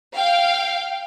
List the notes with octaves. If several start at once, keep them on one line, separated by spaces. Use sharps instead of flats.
F5 G5